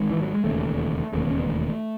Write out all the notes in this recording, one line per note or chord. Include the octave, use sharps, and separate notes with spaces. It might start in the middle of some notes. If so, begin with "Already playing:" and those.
Already playing: G#1 G#2
E3
F#3
G#3
E1 D#2 C#3 A3
E1 D#2 C#3 A3
B3
C#4
B3
A3